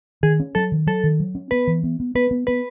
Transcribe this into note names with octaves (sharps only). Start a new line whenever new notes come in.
D#3 G#4
C#4
F#3 A4
D#3
F#3 A4
D#3
F#3
C#4
B3 B4
E3
B3
B3
B3 B4
B3
B3 B4